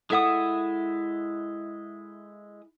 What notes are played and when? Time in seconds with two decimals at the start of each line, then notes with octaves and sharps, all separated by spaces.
0.10 G#3 E4 A4 E5 F#5 D#6